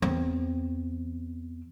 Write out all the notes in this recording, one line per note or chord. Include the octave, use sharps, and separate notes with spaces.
E2 C4